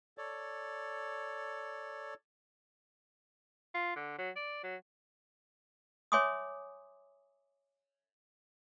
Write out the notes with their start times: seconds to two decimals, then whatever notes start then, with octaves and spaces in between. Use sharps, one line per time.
0.18 A4 C#5 D5
3.74 F4
3.96 D3
4.18 F#3
4.36 D5
4.63 F#3
6.12 C#5 E5 G#5 C6 D6 D#6